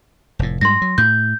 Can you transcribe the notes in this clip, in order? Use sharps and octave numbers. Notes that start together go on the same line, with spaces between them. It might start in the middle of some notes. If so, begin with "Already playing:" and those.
F1 A2
G#2 G3 C6 A#6
F#3
A2 G6